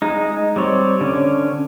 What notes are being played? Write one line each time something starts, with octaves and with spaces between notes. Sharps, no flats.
G#3 D#4
G3 C4 C#5 D5
D3 C#4